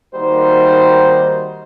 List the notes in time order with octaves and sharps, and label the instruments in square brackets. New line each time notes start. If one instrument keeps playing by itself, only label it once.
[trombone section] D#3 G3 A#3 D#4 F#4 C5